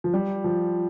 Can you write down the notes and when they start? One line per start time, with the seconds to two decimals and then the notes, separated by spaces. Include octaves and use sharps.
0.04 F3
0.14 G3
0.44 F3